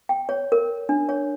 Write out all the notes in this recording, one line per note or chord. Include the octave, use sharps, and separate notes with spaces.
G5
C#5
A#4
D4
C#5